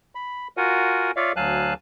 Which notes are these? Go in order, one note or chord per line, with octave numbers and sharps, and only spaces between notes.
B5
F4 F#4 A#4 F#5 G#5
F4 C#5 D5 E5 F5
D2 F#3 F5 G#5 A5 F#6